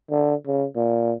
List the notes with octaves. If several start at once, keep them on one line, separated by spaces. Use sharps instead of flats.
D3
C#3
A#2